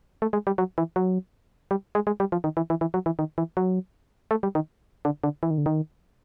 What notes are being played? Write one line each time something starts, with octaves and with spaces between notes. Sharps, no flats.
A3
G#3
G3
F#3
E3
F#3
G3
G#3
G#3
G3
F3
D#3
E3
E3
E3
F#3
E3
D#3
E3
F#3
A3
G3
D#3
D3
D3
E3
D#3
D3
D#3